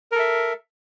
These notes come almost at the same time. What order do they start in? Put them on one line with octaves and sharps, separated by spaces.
A#4 A4 E5